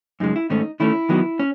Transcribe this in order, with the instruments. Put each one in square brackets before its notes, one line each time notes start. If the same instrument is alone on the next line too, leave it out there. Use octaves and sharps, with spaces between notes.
[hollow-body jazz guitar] F#2 C#3 G#3 D#4
E4
G#2 D#3 A3 C#4 D#4
D#3 A3 C#4 E4
D#3 F#3 B3 D#4
C#4